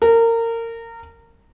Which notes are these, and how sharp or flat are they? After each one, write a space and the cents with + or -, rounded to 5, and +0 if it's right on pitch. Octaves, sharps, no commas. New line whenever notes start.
A#4 -25